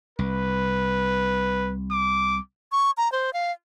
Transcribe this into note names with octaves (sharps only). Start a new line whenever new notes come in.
C2 B4
D6
C#6
A#5
C5
F5